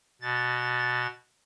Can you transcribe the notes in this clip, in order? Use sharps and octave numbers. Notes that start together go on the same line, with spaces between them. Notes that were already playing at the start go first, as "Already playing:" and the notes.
B2 A6